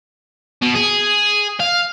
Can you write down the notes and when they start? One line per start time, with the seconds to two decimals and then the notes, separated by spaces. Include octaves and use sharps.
0.62 B2
0.75 G#4
1.60 F5